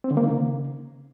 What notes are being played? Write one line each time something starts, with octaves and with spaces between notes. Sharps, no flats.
C4
D3
A#3
D#3
C#3